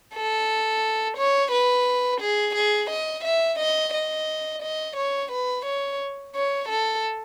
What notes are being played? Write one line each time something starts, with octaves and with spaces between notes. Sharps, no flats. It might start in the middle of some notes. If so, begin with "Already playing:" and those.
A4
C#5
B4
G#4
G#4
D#5
E5
D#5
D#5
D#5
C#5
B4
C#5
C#5
A4